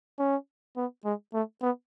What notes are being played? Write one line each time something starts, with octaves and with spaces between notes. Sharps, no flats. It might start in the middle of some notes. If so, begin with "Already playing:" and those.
C#4
B3
G#3
A3
B3